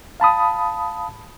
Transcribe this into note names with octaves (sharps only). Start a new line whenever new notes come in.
F5 A5 B5 D#6